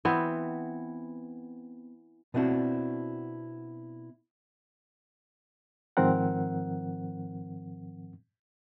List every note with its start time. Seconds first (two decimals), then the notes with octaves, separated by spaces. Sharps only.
0.05 E3 B3 C4
2.34 B2 B3 C4 D4 E4 F#4
5.97 G#2 D#3 F3 C4 A#4 F#5